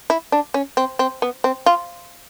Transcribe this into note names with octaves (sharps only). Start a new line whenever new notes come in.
E4
D4
C#4
C4
C4
B3
C4
F4